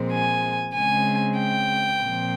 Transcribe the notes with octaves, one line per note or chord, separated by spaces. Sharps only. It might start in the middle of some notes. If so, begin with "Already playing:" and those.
Already playing: A#2 F3 G#3 C4
G#5
C#3 G#3 C4 G#5
G5
A#2 F3 C4